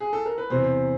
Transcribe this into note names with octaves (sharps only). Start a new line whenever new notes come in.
G#4
A4
A#4
B4
E2 C3 E3 C5